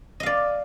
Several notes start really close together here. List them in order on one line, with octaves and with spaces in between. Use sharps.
D#5 F5 D5